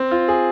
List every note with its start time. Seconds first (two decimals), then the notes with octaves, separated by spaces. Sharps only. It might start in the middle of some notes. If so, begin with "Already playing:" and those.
Already playing: C4
0.11 F4
0.28 G#4